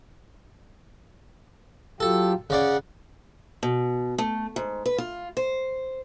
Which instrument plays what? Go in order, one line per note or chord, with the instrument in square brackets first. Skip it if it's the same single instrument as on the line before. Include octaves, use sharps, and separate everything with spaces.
[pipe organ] F#3 F4 G4 [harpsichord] A4
[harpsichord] C#3 D5 [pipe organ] F#5
[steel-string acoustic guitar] B2
A3
G#2
B4
F4
C5